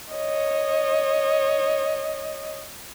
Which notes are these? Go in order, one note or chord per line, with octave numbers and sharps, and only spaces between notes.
C#5 D#5